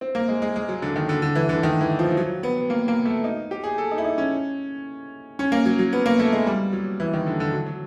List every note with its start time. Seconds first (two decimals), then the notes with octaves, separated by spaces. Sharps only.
0.01 C4
0.15 A#3
0.28 G#3
0.42 G#3
0.56 G#3
0.69 F#3
0.82 D3
0.96 D#3
1.09 D3
1.22 D3
1.35 E3
1.49 D3
1.63 D#3
1.81 E3
1.99 F3
2.11 F3
2.17 F#3
2.43 B3
2.70 A#3
2.88 A#3
3.06 A3
3.24 D#4
3.51 G4
3.63 G#4
3.78 A4
3.91 D#4
3.98 E4
4.04 D#4
4.18 C#4
5.39 C#4
5.52 A#3
5.66 F#3
5.79 F#3
5.93 B3
6.06 A#3
6.19 A3
6.32 G#3
6.46 G3
6.73 F#3
7.00 E3
7.13 D#3
7.26 D3
7.40 D3
7.53 F#3
7.66 F#3